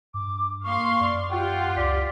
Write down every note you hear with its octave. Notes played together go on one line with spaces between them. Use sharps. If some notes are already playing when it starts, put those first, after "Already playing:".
G2 D6
A#3 F5 C6 C#6
F#2 D5
F4 G4 F#5 G5
C#2 D5 B6